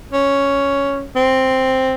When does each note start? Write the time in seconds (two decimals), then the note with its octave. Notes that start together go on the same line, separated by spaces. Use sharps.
0.13 C#4
1.16 C4